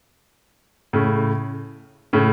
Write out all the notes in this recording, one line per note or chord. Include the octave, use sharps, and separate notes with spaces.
A2 C#3
A2 C#3